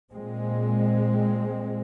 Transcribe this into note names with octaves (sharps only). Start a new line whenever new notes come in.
A#2 G#3 C4